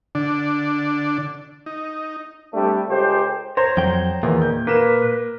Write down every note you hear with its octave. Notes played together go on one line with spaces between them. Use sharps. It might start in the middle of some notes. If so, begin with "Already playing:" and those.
D3 D4
D#4
G3 A3 C4 D4 G4
C#2 C#3 G4 A4 C5
C5 C#5 A#5
F2 F#3 G5
E2 A#2 D#3
G6
A#3 B4 E7